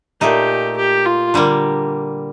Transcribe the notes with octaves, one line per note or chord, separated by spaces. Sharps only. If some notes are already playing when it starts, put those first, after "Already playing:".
A#2 A3 D#4 G4
G4
F4
D3 G3 A#3